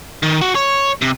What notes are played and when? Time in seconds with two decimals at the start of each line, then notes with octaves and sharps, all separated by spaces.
0.23 D#3
0.41 F#4
0.55 C#5
1.02 C3